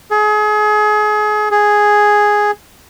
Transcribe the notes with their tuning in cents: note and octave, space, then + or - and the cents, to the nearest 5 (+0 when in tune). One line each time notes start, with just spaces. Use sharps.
G#4 +30
G#4 +0